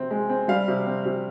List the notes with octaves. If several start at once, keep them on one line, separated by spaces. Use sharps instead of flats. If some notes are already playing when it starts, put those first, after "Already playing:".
Already playing: C3 C4
G#3
C4
G3 F5
C3
C4
C3